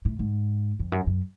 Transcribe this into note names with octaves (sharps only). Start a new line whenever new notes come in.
A2
G#2
F2
F#2
F#2